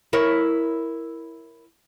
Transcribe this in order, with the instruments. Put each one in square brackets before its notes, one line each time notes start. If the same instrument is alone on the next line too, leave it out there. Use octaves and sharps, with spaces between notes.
[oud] E4 A#4 C#5